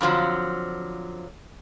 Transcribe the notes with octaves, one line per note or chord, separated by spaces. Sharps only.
F2 D3 F3 F#3